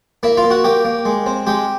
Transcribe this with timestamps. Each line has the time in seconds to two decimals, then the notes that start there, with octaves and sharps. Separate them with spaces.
0.23 A#3 E4 E5
0.37 F4 F5
0.44 A#3
0.51 F#4 F#5
0.64 A#3 G4 G5
0.85 A#3
1.05 G#3
1.26 C4
1.47 G#3 G4 G5